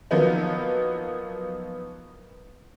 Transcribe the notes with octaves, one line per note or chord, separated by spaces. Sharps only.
F3 F#3 A#3 B3 D#4